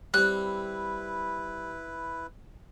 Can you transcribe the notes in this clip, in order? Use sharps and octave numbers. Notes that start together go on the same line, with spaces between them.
G3 C4 E4 B4 F#6